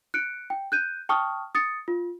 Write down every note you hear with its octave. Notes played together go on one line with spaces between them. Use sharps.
F#6 C#7 D7
G5
F#6 G6 D#7
G5 A5 C#6 D#6 F6
D#6 A6 C#7
F4